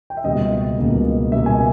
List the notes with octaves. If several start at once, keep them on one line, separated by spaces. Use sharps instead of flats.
G5
E5
C#2 B2 G3 A#3 D#5
C#2 B2 G3 A#3
C#2 B2 G3 A#3 E5
G#5